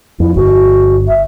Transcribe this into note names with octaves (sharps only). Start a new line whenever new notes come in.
F2 E4
G1 F#4
E5